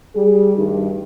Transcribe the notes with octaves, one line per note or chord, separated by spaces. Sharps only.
G3 G#4
D2 G2 D#3 G3 D#4 G4